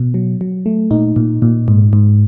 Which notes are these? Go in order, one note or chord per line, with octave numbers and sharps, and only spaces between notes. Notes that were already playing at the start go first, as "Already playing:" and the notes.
Already playing: B2
F#3
F#3
A3
A#2 D#4
A#2
A#2
G#2
G#2